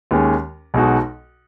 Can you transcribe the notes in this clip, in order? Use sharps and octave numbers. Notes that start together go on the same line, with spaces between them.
D#2 D#3 G#3 C#4
B1 B2 G#3 D#4 F#4